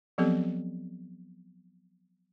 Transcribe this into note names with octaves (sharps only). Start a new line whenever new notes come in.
F3 F#3 B3 C4 G4 A4